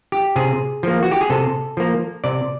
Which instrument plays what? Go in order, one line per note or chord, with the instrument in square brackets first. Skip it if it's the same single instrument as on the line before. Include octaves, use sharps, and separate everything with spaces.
[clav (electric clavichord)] G4
C3 G#4
F3 A#3
F#4
G4
G#4
C3 A4
F3 A#3
C3 D5